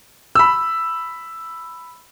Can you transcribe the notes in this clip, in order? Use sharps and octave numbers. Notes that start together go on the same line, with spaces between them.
B5 E6